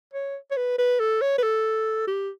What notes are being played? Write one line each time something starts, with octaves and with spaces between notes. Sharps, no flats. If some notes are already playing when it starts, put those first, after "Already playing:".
C#5
C#5
B4
B4
A4
C#5
B4
A4
G4